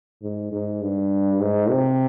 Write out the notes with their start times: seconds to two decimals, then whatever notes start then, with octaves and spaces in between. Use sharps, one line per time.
0.23 G#2
0.52 G#2
0.81 G2
1.41 G#2
1.71 C3